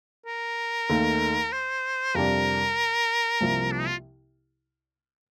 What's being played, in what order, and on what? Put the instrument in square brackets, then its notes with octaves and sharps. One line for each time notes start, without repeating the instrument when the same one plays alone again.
[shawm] A#4
[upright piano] D#2 D#3 A3
[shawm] C5
[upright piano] F2 C3 G3 D4 [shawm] A#4
[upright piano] C2 C3 F3 A#3
[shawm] D4
D#4
F4